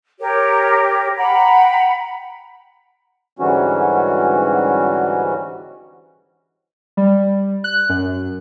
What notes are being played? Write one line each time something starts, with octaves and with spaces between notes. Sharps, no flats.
G4 A#4 C#5
F#5 G5 A#5 B5
G#2 D3 E3 G3 C#4 F#4
G3
F#6
F#2